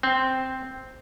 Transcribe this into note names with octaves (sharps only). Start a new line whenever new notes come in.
C4